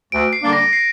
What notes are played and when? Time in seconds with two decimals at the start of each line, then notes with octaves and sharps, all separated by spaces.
0.12 D2 D7
0.33 C7
0.43 D3 G3 A#3 D4
0.53 A#6
0.73 C7